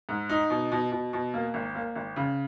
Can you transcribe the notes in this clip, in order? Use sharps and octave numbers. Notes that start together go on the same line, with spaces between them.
G#2
D#4
B2
B2
B2
B2
A#3
G#1
A#3
G#1
C#3